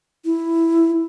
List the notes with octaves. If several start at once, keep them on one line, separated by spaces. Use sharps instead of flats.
E4